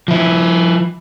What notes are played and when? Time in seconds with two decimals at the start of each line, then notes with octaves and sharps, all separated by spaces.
0.08 F3 E4